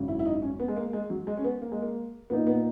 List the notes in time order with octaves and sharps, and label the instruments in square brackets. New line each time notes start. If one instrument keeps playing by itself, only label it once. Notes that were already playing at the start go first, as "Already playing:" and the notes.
Already playing: [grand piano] G#1 F#2 C#3
[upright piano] E4
E4
D#4
C#4
B3
G#3
A#3
G#3
F#3
G#3
C#4
B3
A#3
G#3
A#3
[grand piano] A#2 A#3 D#4 [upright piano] B3
[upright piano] B3